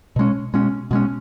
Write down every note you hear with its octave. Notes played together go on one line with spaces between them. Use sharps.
B2 G#3 C#4
B2 G#3 C#4
B2 G#3 C#4